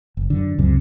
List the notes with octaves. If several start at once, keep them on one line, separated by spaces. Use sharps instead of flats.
F#1
F#2 D3
C#2 F#2 C3